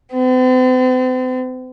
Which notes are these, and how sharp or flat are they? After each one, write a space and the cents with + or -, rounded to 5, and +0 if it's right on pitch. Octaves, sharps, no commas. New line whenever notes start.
C4 -45